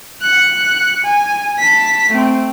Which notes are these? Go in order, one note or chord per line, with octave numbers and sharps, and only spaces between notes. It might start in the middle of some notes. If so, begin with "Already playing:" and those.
F#6 C#7
G#5
A5 B6
A3 C4